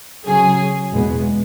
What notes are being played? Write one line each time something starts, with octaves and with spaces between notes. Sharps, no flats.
C#3 F#3 C#4 G#4
E2 B2 G#3 B3